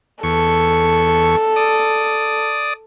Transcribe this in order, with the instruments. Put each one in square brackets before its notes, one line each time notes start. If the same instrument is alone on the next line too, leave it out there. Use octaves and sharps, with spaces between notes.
[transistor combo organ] E2 C#6 [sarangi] A4
[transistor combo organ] D5 D#6